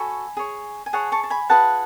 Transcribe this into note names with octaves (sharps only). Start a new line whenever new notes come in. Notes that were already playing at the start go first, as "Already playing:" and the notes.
Already playing: F#4 A4 C#5 G#5 B5
G#4 C#5
G#5
G#4 C#5 F#5 A5
A5 C#6
A5
G#5 B5
F4 G#4 B4 F#5 A5